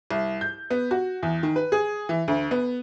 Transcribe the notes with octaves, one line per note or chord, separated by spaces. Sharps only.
C2
G6
B3
F#4
E2
D#3
B4
G#4
E3
D2
B3